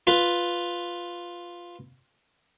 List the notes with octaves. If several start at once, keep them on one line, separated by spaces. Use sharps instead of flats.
F4 B4